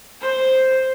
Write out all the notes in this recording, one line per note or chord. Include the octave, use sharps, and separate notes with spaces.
C5